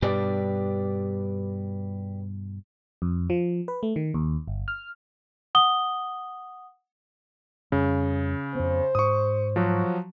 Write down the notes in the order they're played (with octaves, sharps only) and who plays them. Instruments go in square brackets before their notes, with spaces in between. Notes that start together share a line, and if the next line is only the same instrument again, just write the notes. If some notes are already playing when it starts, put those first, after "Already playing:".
[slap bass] G2 B2 G3 [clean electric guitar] G4 B4 D5
[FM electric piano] F2
F3
B4
A3
D#3
D#2
G1
F6
[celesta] F#5 D#6 G7
[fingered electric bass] F2 G3 [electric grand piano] C#3
[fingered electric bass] F2 B3 [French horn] C5
[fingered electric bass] G#2 [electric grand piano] C#6 D#6
[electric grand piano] F3 F#3 F#4